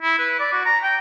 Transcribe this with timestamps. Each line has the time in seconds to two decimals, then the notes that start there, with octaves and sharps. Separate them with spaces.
0.02 E4
0.19 B4
0.39 D5
0.52 F#4
0.65 A#5
0.83 G5